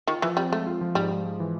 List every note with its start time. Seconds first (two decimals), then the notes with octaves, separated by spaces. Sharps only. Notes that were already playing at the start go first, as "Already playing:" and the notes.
0.07 D#3 F4
0.22 E3 F3
0.37 G3 C4
0.52 G#3 A3
0.67 F4
0.81 F3
0.95 G#2 G3
1.10 G#2
1.25 G#3
1.40 E3